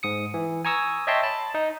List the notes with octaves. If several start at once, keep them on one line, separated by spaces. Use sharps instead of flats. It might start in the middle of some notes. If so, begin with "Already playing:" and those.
G#2 D#6 C#7
E3
G#5 A#5 C#6 D#6 E6
C#5 D#5 E5 G5 A5 C6
A5 B5
D#4